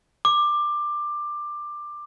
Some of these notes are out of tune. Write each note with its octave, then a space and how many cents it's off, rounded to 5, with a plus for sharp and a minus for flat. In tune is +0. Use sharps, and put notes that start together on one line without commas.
D6 +15